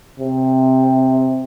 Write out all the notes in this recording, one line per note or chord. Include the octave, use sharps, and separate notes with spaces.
C3